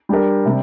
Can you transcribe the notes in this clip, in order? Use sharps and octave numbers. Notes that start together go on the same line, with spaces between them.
G3 D4 G4 A#4
C3 G3